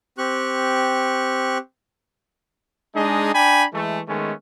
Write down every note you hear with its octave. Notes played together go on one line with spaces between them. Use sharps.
C4 G4 C#6 F#6
G#3 D4 D#4 G#4 D#5
D4 G5 G#5 B5
E3 G#3 A3
D#3 G#3 A3 B3 C#4